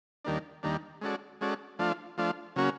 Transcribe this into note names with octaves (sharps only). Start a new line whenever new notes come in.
D#2 D#3 G3 A#3 D4
D#2 D#3 G3 A#3 D4
G#3 C#4 F#4 A4 D5
G#3 C#4 F#4 A4 D5
F3 A3 D4 F4
F3 A3 D4 F4
C#3 F#3 A#3 C#4 F#4